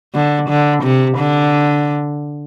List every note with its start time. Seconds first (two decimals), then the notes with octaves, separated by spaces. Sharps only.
0.14 D3
0.49 D3
0.83 C3
1.18 D3